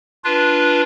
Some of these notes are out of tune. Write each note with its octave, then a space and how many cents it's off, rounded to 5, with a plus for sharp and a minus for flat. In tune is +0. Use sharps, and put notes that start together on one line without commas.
D4 -5 F4 -15 B4 -15